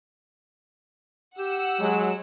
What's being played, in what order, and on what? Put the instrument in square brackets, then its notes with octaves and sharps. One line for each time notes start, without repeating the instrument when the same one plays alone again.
[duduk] G4 [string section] F#5 E6
[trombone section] F#3 G#3